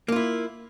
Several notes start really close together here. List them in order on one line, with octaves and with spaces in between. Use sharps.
A#3 F4 E4